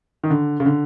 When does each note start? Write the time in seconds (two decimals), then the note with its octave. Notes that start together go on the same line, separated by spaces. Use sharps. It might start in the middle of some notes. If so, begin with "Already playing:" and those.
0.24 D#3
0.30 D3
0.60 C#3
0.65 D3